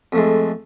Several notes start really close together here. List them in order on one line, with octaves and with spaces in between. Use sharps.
F2 A3 G#3